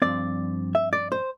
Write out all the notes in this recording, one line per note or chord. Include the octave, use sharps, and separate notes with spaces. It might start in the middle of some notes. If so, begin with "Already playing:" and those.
G2 F3 C4 D5
E5
D5
C5